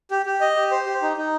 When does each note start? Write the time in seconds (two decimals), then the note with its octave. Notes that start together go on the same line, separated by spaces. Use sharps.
0.11 G4
0.26 G4
0.41 D#5
0.56 G4
0.71 C5
0.86 G4
1.02 D#4
1.17 D#4